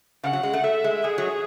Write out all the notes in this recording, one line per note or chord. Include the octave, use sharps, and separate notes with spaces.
C#3 F#5
F#3
G#3
A3
A3 E5
G#3
G#3 G#4
F#3